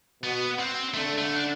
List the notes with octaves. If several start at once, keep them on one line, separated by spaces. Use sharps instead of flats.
B2 B3
C4
D3 A3
A3
D4